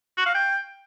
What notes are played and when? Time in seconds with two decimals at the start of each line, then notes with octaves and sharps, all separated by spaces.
0.18 F#4
0.26 F5
0.35 G5